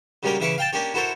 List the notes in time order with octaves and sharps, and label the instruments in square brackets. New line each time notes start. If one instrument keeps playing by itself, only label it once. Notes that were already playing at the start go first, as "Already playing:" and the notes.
[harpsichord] C#3 F#3 G3 A#3 C#4 A#4
C#3 E3 E5 F5 C#6 D6
F5 G5 A5
A#3 C#4 D4 G4 C#5
E4 F#4 A4 A#4 C5 C#5